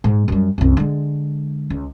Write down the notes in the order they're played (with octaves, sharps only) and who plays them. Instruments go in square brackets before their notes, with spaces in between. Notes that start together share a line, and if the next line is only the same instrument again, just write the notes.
[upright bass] G#2
F#2 G3
C2 F#2
D3 G#3
C#2